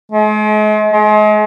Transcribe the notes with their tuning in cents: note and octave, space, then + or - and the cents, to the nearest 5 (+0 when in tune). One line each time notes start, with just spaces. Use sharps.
G#3 +45
G#3 +40